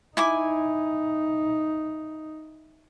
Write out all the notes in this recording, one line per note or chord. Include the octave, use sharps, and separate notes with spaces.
D#4 E4 G#5 D6